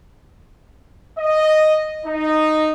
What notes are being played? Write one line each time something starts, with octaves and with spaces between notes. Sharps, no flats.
D#5
D#4